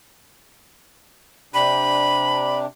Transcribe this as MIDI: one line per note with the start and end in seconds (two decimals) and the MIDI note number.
1.54 2.66 48
1.54 2.66 62
1.54 2.66 67
1.54 2.59 83